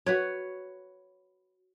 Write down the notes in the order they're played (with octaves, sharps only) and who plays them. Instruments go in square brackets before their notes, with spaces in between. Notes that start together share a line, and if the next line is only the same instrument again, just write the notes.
[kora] F#4 B4 C#5